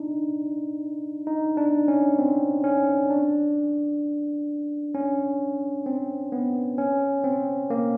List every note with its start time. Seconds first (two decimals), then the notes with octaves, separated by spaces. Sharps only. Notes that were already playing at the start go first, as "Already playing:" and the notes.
Already playing: D4 D#4
1.27 D#4
1.57 D4
1.88 C#4
2.19 C4
2.64 C#4
3.10 D4
4.94 C#4
5.86 C4
6.32 B3
6.78 C#4
7.24 C4
7.70 A#3